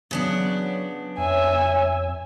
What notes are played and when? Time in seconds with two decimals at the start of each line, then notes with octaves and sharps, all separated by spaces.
0.11 C#3 F#3 B3 D4
1.18 F2 C#5 E5 G#5